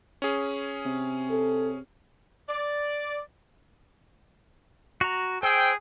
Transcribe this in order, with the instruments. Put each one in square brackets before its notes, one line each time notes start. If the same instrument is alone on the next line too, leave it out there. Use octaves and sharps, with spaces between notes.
[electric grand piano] C#4 G#4
[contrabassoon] C3
[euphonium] A4
[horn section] D5
[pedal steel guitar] F#4 A#5
[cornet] G#4 [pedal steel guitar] C5 E6 [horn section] G5